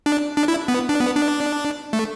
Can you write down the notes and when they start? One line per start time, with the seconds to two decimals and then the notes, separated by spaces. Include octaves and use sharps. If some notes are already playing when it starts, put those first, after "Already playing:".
0.06 D4
0.37 D4
0.48 E4
0.68 B3
0.89 D4
1.00 B3
1.16 D4
1.93 A3